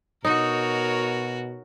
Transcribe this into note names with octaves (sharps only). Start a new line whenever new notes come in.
B2 D#4 F#4 A#4 C#5